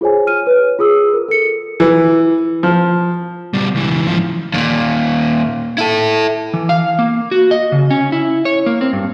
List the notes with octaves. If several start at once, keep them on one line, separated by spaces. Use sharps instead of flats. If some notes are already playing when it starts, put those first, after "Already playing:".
F4 G#4 C5 C#5 G#5
F6 D#7
B4 C#5
F4 G#4 D#6 E6
A#4
A4 C#7
E3
F3
B2 G3
C#2 E3
G#2 F3
D#2 A#2
E4 A4
E3
F5
A#3
F#4
D#5
C#3
C#4
E4
C#5
A#3
C4
G2